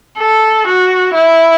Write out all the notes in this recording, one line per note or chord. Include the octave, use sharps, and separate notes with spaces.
A4
F#4
E4